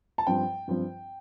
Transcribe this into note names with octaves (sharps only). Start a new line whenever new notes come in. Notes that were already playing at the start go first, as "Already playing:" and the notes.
A5
G2 F3 C4 G5
G2 F3 C4